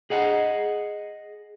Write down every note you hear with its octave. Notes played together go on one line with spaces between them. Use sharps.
G#4 D#5 F#5